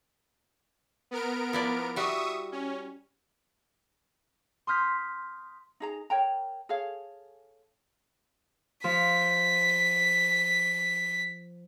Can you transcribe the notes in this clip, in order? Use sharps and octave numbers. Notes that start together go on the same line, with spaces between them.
B3 A#4 D7
F3 E4 D5
G3 F#4 E5 C#6 D#6
C#4
C6 D#6 F6 G6 B6
D#4 G#4 A#5
A#4 C#5 G5 A#5
G#4 A4 C#5 F5
F3 B6